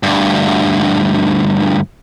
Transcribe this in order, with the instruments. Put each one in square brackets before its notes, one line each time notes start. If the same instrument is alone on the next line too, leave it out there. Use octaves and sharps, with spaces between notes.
[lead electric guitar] D2 G2